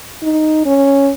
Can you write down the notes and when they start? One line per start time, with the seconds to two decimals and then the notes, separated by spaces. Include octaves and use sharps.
0.23 D#4
0.66 C#4